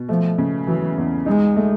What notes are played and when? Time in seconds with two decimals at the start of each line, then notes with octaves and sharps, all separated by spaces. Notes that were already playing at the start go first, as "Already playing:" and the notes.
Already playing: B2
0.09 F3 A3
0.38 C#3
0.67 E3 F#3
0.98 E2
1.26 G#3 D#4
1.56 A3